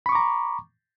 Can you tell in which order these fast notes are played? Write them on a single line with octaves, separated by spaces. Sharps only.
B5 C#6 D6 A#5